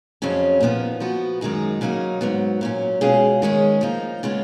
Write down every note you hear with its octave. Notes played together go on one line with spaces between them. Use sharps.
F2 C#3 F#3 C#4 G#4
A#2 F3 B3 D#4
F3 B3 F#4
F#2 D#3 G#3 D#4 G#4
C#3 F#3 A#3 D#4
G#2 F#3 B3
A#2 F#3 C#4
B2 G#3 C#4 F4 G#4
D#3 G#3 C#4 G#4
F3 A#3 D#4
C#3 G#3 B3 F4